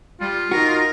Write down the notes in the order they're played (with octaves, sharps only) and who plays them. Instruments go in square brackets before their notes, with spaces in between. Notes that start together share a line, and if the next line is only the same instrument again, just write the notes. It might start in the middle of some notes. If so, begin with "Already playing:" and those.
[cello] G3 [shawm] F4
[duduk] D#4 [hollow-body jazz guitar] F#4 [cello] A#4